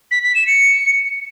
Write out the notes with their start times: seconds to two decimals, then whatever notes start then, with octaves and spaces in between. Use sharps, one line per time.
0.11 B6
0.23 B6
0.35 E7
0.47 C#7